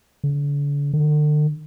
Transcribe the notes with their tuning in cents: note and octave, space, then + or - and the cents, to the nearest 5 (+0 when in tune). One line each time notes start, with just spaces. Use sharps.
D3 -40
D3 +40